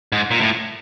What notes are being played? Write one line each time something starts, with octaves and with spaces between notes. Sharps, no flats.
G#2
A#2
A2